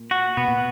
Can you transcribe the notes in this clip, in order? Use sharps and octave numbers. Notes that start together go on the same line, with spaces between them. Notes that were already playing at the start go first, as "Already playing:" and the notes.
Already playing: A#2
F#4
B2 B3
A#2